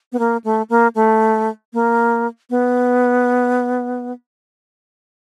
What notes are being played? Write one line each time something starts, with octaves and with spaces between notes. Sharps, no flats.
B3
A#3
A3
A#3
A3
A#3
B3